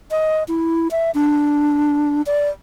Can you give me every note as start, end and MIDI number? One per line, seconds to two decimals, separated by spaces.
0.11 0.44 75
0.48 0.88 64
0.91 1.11 76
1.15 2.22 62
2.26 2.49 74